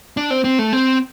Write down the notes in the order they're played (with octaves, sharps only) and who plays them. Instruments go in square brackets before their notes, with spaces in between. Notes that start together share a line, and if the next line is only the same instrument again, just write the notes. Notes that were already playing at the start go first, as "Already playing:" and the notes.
[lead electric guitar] D4
C4
C4
A3
C4